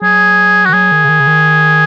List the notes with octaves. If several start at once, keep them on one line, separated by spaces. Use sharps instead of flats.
F#3 G#4
F#4
D#3
F#3 G#4
D#3
C#3
D#3
C#3
D#3